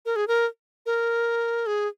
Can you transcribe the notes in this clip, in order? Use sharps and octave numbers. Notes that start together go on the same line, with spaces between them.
A#4
G#4
A#4
A#4
G#4